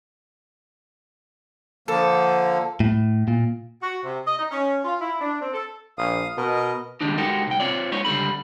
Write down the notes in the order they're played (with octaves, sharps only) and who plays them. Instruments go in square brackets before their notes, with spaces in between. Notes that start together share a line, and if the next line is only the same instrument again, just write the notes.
[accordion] D3 F3 A#3 [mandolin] A4
[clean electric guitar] A2
A#2
[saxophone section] F#4
C3
D#5
D#4
C#4
F4
E4
D4
C4
A4
[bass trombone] A#1 [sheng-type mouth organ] F5 D#6
[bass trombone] B2 [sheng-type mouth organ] A#4 D#5
[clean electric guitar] D#3 G3 G#3 D4 D#4
G#3 D#4 F#4 G4 A4 A#4
C2 G5
C4 F4 C#5 D5
G#3 B3 D#4 C#5
C#2 D3 G3 A4 B5